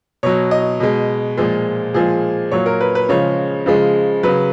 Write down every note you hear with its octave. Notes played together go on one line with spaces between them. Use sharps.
B2 F#3 C#5
D#5
B2 G#3
A#2 F3 G#3
A#2 F3 G#3 G#4
A#2 F#3 C#5
A#4
B4
B4
C#3 F3 G#3 C#5
C#3 F3 G#3
C#3 F#3 B4